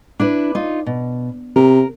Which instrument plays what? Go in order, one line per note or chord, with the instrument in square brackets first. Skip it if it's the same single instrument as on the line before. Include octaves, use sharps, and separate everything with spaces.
[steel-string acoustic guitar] D4 E4 B4
D#4 F4
B2
[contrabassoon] C3 [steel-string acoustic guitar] A#4